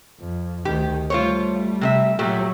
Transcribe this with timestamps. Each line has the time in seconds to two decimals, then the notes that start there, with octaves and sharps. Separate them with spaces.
0.20 F2
0.65 D2 D#3 G4
1.10 G3 A3 F4 C5 C#5
1.81 C3 G#4 E5
2.19 A#2 F#3 A3 G4